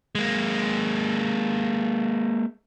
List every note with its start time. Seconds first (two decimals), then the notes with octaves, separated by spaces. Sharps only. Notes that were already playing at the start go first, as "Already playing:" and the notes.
0.15 G#3 A#3